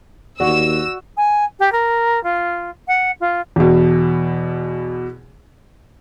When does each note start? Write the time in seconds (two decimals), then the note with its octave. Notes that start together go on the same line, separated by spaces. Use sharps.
0.40 D#2 F#4 D5 F#5 E6
1.17 G#5
1.59 G4
1.72 A#4
2.24 F4
2.88 F#5
3.20 F4
3.56 E2 B2